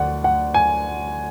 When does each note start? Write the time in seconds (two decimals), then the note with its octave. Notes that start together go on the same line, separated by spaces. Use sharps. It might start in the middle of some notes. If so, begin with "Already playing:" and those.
Already playing: D2 D3 D5 F#5
0.24 F#5
0.54 G#5